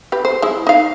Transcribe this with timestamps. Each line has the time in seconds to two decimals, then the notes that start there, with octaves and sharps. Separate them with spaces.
0.12 G4 B4
0.25 C5
0.42 G#3 E4
0.67 D#4 F5